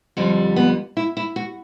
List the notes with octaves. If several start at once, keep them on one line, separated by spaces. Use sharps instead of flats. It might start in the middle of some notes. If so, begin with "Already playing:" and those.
F2 D3 G3 C#4
B3
E4
E4
F#4